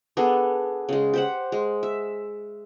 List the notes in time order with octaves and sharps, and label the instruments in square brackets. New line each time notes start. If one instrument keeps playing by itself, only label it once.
[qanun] B3 D4 G#4 A4
C#3 G#3
G4 C5 F#5
G#3
E5